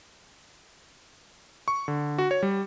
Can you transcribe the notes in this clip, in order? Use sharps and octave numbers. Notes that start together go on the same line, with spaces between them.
C#6
D3
F#4
C#5
G3